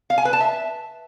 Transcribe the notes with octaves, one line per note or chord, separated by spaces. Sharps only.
F5
G#5
B4
A5
E5